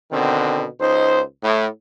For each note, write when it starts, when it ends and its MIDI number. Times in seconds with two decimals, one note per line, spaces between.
0.12 0.66 47
0.12 0.66 50
0.12 0.66 51
0.12 0.66 60
0.80 1.22 37
0.80 1.22 63
0.80 1.22 72
1.43 1.67 45